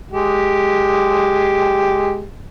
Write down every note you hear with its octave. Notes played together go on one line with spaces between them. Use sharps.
G#3 G4